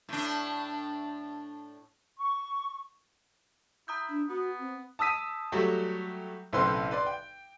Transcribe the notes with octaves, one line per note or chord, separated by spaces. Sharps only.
A2 D4
C#6
E4 A#5 D#6 G6
D4
B3 F#4
C4
A5 D#6 E6 B6 D#7
F#3 G3 A3 F#4 G4
B1 A2 C#3 C4 B4 C6
B4 D5 C6
G5